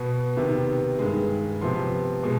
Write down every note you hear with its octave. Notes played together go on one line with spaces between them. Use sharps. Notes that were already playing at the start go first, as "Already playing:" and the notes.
Already playing: B2 B3
C3 D#3 B3
G2 D#3 G#3
C3 F3 B3 C6
B2 G#3